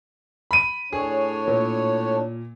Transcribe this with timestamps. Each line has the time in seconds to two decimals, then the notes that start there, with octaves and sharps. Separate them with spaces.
0.51 B5 D#7
0.93 A2 D4 G#4 C#5
1.47 A#2